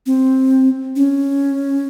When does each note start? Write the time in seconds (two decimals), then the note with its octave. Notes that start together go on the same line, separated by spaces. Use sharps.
0.06 C4
0.96 C#4